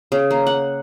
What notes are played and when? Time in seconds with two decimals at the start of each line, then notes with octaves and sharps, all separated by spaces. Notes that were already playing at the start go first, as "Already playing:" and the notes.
0.12 C#3
0.31 A#3
0.47 F#5